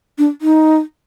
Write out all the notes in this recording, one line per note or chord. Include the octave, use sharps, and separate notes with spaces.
D4
D#4